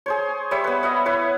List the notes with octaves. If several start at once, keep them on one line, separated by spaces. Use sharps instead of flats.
G#4 C5 C#5
G3 C5 C#5 E5
B3 B4
D#5 E5 F#5
E4 B4 C#5